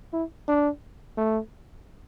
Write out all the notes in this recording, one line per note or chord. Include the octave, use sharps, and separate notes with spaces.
E4
D4
A3